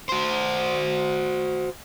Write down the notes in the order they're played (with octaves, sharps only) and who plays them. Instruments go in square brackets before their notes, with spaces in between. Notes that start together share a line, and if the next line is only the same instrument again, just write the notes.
[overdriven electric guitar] F#4 C5